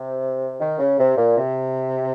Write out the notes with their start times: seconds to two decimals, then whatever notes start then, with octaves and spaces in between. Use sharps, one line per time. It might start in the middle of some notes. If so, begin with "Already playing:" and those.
Already playing: C3
0.60 D#3
0.79 C#3
0.98 C3
1.17 A#2
1.37 C3